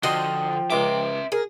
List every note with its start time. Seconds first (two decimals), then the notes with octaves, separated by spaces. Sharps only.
0.03 D3 F3 F#4 D#5 G5 C6
0.70 C#2 E5 C6 D6
1.32 G#4 A#4